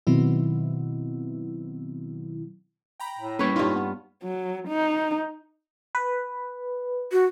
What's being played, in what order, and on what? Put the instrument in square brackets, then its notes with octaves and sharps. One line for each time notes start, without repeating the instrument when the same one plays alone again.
[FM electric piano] B2 D#3 F#3 B3 C4 E4
[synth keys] G5 A#5 B5
[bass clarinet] A2
[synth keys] G3 A#3 C#4 [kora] B4 C#5
[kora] G2 F4 [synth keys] D#4
[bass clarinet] B3
[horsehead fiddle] F#3
D#4
[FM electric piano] B4
[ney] F#4